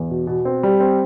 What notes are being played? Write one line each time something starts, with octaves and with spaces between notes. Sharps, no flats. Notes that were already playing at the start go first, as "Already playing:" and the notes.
Already playing: E2
B2
B2
C4
G3
C4